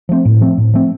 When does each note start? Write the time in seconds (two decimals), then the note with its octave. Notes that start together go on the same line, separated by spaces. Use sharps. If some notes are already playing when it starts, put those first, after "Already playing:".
0.09 F3 A3 C4
0.25 A2
0.41 F3 A3 C4
0.58 A2
0.74 F3 A3 C4